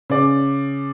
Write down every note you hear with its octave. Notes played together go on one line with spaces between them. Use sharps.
C#3 D5